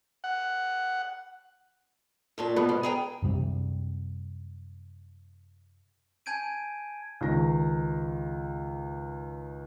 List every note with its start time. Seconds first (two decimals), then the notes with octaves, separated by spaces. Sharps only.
0.24 F#5
2.38 F#2 A#2 A5
2.56 B2 B3
2.69 G#2
2.83 G#4 G5 A#5
3.22 F#2 C3 G3 C4
6.26 G#5 A5 G6 G#6 D7 D#7
7.21 C#2 D#3 A#6